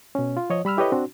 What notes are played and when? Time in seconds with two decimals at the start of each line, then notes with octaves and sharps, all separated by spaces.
0.15 B2 C#4
0.37 F4
0.50 F3 C#5 D#5
0.65 G3 B5 E6 F6
0.78 E4 G4 A4 B4 C#5 D#5
0.92 C4 D4 F#4